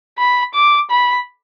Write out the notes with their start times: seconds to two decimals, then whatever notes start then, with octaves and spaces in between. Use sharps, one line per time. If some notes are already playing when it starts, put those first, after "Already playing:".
0.18 B5
0.54 D6
0.90 B5